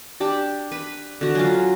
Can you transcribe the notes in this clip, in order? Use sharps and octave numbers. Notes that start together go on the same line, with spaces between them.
D4 G4 D5
B4
D3 F#4
F#3 C#4 F4